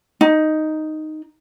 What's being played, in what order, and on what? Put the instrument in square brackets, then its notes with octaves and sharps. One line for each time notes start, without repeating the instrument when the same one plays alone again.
[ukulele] D#4